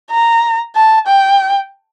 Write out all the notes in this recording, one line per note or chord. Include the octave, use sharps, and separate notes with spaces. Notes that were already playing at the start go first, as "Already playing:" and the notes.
A#5
A5
G5